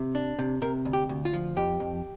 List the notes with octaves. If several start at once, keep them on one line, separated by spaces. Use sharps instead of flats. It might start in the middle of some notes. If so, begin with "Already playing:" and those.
Already playing: C3
D4
C3
C3 A#4
D2
G4
D2
F4
F3
F2 G4
F2